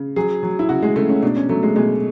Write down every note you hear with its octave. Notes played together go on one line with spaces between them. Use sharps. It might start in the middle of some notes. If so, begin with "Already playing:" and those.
Already playing: C#3
F#3 G#4
F#3
E4
C#3 F#4
G#3
C#3 A3
C#4
B2 D4
C#4
F#3 A3
G#3
B2 G#3